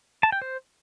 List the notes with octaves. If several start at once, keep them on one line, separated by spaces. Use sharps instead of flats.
A5
G5
C5